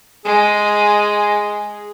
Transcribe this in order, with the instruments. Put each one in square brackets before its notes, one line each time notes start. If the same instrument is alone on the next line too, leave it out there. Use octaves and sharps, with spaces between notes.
[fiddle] G#3 [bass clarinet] G#4